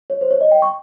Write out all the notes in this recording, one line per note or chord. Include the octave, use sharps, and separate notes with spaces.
C#5
C5
C#5
D#5
G5
C#6